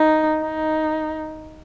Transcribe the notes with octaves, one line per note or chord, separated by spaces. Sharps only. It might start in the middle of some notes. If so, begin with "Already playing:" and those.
Already playing: D#4
D#4